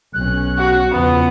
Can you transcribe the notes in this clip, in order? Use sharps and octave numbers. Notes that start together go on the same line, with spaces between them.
B1 C#4 F#6
F#4
E2 C#3 F3 B3